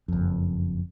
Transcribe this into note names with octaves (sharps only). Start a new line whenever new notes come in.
F#1 F2